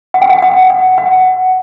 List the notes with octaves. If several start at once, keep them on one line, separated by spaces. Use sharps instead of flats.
F#5
G5
F#5
F#5
F#5
F#5